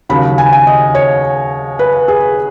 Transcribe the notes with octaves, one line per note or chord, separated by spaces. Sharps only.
D#2 C#3 F#3 B5
G#5
G#5
D#5
C#5
B4
G#4